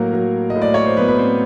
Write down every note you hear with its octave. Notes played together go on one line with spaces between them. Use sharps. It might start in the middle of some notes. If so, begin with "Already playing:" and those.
Already playing: A2 F#3 A#3 A#4
F#3
D#5
A2
D5
C#5
C5
F#3 B3 B4
B4
C4 C5